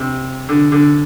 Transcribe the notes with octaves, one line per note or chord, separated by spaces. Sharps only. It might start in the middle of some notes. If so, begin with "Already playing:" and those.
Already playing: C3
D3
D3